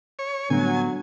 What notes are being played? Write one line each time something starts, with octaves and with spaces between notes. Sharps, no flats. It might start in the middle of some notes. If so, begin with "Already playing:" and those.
C#5
A2 D3 F#3 G3 B3 G#5